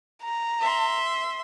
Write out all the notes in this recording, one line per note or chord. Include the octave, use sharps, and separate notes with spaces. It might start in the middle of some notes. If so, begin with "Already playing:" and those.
A#5
E5 C6